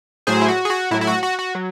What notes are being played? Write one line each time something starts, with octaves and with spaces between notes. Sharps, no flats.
A2 F#3 G#4 C5
E4
F#4
G#4
F#4
A2 F#3 E4
E4
F#4
F#4
F#4
F#3